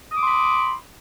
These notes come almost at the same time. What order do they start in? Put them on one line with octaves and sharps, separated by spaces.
D#6 D6 C6 B5